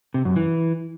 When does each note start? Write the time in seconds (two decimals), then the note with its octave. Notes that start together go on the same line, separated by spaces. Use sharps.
0.14 C3
0.25 F#2
0.36 E3